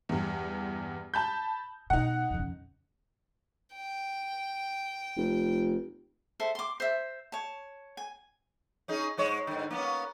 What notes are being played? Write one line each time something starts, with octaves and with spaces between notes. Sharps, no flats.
E2 G2
A5 B5 G6
B2 D#4 F#5
F2 C#3
G5
F1
A4 C5 E5
C6 D6
C5 E5
C#5 A5
G#5
C#4 D#4 G#4
G#2 G#3 C#5
G#2 D3
A#3 B3 C#4